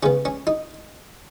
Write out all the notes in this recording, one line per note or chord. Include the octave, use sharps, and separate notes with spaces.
C#3 B3 C#4
C#4
D#4